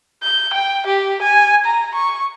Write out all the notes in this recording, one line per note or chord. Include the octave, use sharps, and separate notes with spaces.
G6
G5
G4
G#5
A#5
C#6